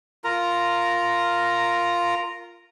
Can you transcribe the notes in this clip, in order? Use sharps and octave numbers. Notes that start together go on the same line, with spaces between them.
F4 A#4 A#5